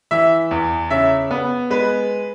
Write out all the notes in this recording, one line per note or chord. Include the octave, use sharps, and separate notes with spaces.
E3 E5
E2
C#3 E5
B3
G#3 B4